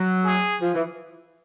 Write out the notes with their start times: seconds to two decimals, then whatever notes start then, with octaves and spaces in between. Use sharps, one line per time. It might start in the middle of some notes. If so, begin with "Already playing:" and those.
Already playing: F#3
0.24 G#4
0.61 F3
0.73 E3